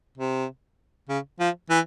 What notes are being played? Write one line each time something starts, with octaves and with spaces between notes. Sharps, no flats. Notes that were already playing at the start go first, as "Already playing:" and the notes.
C3
C#3
F3
E3